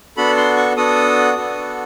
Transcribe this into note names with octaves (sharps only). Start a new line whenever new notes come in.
B3 D4 F#4 A4 B5
C6
C#6
B3 D4 F#4 A4 D#6
B3 D4 F#4 A4